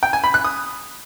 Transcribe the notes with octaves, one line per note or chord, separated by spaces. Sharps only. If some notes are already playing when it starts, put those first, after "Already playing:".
G5
G#5
B5
F#6
D#6